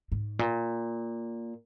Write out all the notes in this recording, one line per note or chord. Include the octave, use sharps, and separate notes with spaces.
G#2
A#2